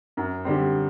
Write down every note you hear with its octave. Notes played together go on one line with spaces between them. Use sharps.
F#2
D3 G3 C4